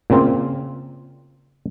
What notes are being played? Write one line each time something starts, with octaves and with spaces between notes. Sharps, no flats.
A#2 C#3 A#3 C4 F4